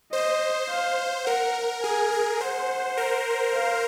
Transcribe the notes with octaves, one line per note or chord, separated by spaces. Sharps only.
C5 D#5
F5
A#4 F#5
G#4 G#5
A#4
C5 F#5
A#4
F5